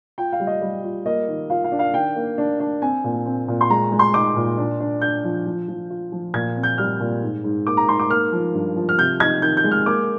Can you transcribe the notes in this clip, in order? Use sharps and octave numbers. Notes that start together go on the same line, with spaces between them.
F4 G5
F5
G3
D#5
G3
F4
A#3 D#5
D#3
F4 F5
F5
D4
F5
D#3 G5
A#3
D4
D4
C4 G#5
A#2
C4
A#2
C6
G#3 A#5
G#3
C6
D#4 D6
A#2
D4
D4
D4 G6
F3
F3
F3
F4
F3
A#2 G#6
C4
G6
G3 F6
A#2
G#2
G#2
A#3 D6
A#5
G#2 C6
D6
A#3 F6
F3
G2
F3
F6
C3 G6
D#4 G#6
D#3 G6
G6
G#3
F6
A#3 D6